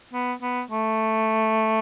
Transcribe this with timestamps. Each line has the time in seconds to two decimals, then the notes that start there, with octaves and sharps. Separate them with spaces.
0.13 B3
0.42 B3
0.71 A3